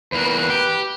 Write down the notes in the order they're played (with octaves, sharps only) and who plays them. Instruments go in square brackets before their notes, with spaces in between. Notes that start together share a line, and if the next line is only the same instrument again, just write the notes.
[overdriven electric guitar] E2 A#3 [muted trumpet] B4
[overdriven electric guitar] G4